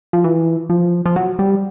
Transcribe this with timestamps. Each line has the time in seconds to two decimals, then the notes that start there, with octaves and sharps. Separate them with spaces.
0.13 F3
0.24 E3
0.70 F3
1.06 F3
1.16 F#3
1.39 G3